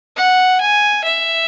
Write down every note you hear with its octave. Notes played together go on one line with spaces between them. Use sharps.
F#5
G#5
E5